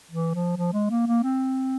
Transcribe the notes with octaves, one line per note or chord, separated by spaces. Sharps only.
E3
F3
F3
G#3
A#3
A#3
C4